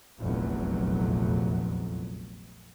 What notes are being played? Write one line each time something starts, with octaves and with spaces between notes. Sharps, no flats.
F1 A#1 E2 F#3